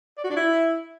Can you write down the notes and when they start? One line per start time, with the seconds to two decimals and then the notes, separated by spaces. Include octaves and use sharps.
0.18 D5
0.24 F#4
0.30 D4
0.36 E4